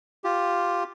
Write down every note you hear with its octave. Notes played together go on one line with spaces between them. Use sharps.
F4 G4